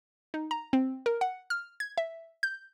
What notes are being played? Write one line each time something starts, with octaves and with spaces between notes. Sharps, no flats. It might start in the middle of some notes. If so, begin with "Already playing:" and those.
D#4
A#5
C4
A#4
F#5
F6
G#6
E5
G6